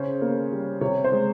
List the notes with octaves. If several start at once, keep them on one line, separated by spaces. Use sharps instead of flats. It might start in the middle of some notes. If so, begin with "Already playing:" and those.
Already playing: C#3 C#4 C5
A#3
G3
C3 C#5
C5
G#3